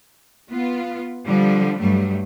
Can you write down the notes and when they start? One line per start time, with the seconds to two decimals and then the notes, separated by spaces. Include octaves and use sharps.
0.51 B3 F4
1.25 D3 F3 G3
1.78 G2 F#3 G3 A3